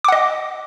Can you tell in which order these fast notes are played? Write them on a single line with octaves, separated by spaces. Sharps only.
D6 F#5 D#5